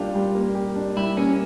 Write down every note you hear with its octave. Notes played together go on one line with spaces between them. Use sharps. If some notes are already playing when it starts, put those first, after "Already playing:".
Already playing: G3 A#3 D4 F4 G4
G3
A#3
G4
D4
G3 E4
A#3 C#4